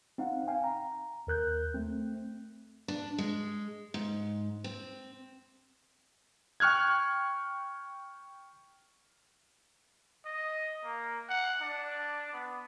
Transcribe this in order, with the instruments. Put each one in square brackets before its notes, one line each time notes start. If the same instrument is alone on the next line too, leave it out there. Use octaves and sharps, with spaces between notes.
[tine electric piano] C4 D#4 F5 F#5
F5 G5 G#5
A#5
D#2 A#4 F#6 G6
A3 C4
[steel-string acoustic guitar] D4
G#3
G#2
C4
[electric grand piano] G5 C#6 F6 F#6 G#6
[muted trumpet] D#5
A#3
F#5
D4
B3